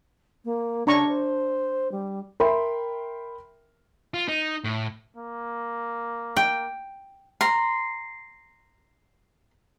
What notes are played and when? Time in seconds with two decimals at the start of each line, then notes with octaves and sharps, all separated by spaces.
0.45 A#3
0.87 C#3 D4 A#5 C#6
1.08 C5
1.92 G3
2.40 A#4 E5 G5 B5 C6
4.14 F4
4.28 D#4
4.64 A2
5.17 A#3
6.36 G5
7.41 A#5 C6